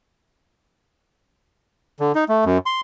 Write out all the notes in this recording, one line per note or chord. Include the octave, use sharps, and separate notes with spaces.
D3
D#4
A3
F#2
C6